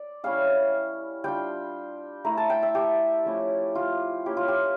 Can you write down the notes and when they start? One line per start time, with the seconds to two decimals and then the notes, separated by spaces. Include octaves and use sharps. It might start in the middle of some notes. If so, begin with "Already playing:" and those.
Already playing: D5
0.23 G3 C#4 E4 F5
1.24 G3 D4 F4 G5
2.24 A3 E4 A#5
2.37 A5
2.50 G5
2.63 E5
2.75 G4
3.26 F3 A3 C#4 E4
3.75 F4
4.26 A#3 C#4 E4 G4
4.37 F4
4.48 G4